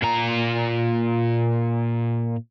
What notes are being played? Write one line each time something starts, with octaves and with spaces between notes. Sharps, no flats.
A#2 A#5